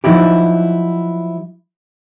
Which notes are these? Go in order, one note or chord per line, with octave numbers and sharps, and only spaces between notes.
F3 F#3 D#4 E4 G4